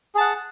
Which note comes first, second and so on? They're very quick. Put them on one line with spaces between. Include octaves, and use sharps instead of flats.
G#4 A5 F#5